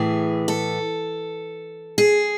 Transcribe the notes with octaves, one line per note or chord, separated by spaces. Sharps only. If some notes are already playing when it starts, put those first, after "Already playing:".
Already playing: A2 E3 G#4
A4
G#4